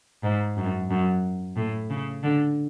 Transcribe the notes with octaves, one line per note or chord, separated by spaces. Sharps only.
G#2
F#2
F#2
A2
C#3
D3